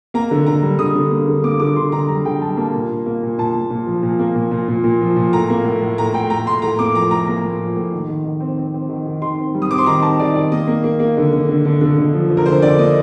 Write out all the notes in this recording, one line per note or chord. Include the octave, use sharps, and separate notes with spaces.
A#3 A#5
D3
D3 A#5
G3
D3 D#6
D3
A#3
D3
A#3 D6
D3 D6
D3 C6
D3 A#5
G3 A#5
D3 G5
G3 A5
A#3 A5
A#2
A#2
A#3
A#2
A#2 A5
A#2
A#2
F3
A#2
A#3
A#2
A#2
A#2
A#2
F3
A#2
A2 A#5
A#3
A2
A2
A2 A#5
A2 G5
A2 A#5
A2 C6
A2 A#5
A#3 D6
F3 A#5
A2 A#5
A#3 A#5
A2
F3
A2
D#3
D#3
D#3
C4
C4
C4
D#3
D#3
D#3 C6
C4
G3
D#6
C4 D6
C6
D#3 A#5
C4 A5
D#3 D5
D#3 D5
A#3 D#5
A#3
A#3
A#3
D3
D3
D3
D3
D3
D3
F3
F3
A#4
D3 C5
D3 D5
A#3 D#5